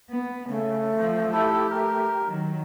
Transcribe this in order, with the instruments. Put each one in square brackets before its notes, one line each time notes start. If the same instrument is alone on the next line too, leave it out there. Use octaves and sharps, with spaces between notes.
[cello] B3
[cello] C#3 [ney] A3
[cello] F3 C4
[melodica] E4 A4 [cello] G4
[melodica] A#4
[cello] D#3 F#3